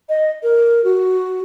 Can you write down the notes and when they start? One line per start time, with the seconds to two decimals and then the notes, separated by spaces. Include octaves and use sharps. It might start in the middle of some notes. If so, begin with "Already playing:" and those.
0.09 D#5
0.43 A#4
0.84 F#4